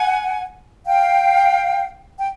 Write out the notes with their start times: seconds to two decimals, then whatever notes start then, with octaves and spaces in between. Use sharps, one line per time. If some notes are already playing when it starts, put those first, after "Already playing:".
Already playing: F#5 G#5
0.85 F5 G5
2.17 G5